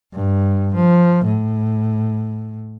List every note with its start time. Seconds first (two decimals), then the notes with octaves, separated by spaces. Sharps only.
0.14 G2
0.75 F3
1.26 A2